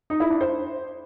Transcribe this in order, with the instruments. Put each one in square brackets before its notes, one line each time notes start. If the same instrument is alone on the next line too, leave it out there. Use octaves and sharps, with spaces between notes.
[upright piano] D#4
E4
D4
C5